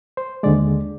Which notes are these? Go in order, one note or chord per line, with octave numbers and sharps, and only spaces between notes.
C5
D#2 D3 G#3 D5